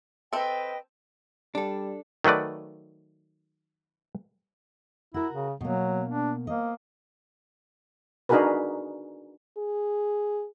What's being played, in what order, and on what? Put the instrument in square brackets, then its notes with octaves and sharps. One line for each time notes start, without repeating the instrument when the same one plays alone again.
[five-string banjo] C4 A4 [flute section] B4 D#5 G5
[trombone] G3 [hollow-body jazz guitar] D4 A4
[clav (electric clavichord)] D#3 F#3 A3 B4 D5
[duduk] E4 [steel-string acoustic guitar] F#4 A#4
[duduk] C#3
[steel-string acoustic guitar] B2 A#3 [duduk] F#3
[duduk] D4
[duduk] A#3 [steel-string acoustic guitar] C5 D#5
[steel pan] D4 D#4 F#4 G#4 A#4 B4
[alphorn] G#4